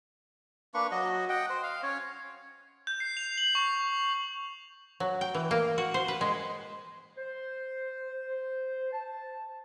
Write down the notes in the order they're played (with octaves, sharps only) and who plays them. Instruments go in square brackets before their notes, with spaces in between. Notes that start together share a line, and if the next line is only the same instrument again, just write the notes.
[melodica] A#3 D4 B4 C#6
F#3 F#4 D#5
D#5 F#5 G5
C5
F5
C#4 C#5
[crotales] G6
C7
F7
F#7
C#6
[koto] F#3
G5
E3
A#3
F#4
C5
B4
G#3
[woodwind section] C5
A5